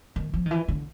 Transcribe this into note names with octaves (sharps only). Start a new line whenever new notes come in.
D#3
F3
D#3
E3
D3